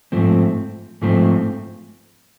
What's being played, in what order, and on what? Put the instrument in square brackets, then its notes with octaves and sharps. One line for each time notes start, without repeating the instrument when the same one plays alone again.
[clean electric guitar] G#2 F3 A3 C4
G#2 F3 A3 C4